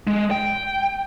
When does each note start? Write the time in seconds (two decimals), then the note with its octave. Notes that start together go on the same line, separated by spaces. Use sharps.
0.07 G#3
0.31 G5